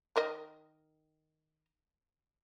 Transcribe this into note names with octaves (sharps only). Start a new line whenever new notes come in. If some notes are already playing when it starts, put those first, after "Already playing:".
D#3 A#4 D#5